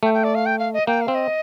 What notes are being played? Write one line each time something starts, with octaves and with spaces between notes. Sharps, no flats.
A3 G5
G5
D5
F5
G5
F5
D#5
A#3 G5
F5
C4
D#5